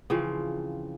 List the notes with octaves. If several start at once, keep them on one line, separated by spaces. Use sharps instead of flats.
C#3 E3 F3 C4